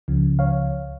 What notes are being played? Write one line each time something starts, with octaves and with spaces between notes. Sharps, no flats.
C#2 C#3 F3
C#5 F5